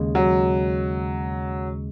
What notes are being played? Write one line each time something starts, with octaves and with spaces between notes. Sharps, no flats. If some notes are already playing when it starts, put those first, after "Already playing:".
Already playing: D#2 C#3 G#3
F#3